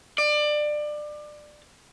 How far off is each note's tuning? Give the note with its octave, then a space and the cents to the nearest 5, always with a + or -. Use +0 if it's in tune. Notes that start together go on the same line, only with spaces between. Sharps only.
D5 +25